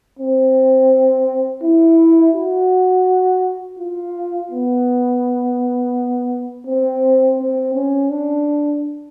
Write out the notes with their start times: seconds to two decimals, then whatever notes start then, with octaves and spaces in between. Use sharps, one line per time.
0.19 C4
1.63 E4
2.34 F#4
3.79 F4
4.51 B3
6.67 C4
7.39 C4
7.75 C#4
8.10 D4